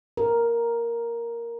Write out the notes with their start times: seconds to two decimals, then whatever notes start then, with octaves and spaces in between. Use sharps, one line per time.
0.17 A#4